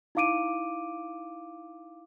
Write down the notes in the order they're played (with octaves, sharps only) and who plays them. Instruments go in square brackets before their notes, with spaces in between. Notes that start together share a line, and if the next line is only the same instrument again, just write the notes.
[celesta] D#4 E4 F5 D6 D7 D#7